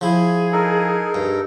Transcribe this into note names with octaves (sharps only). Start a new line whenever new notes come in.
F3 E4 G#4
D#4 A4 A#4
G2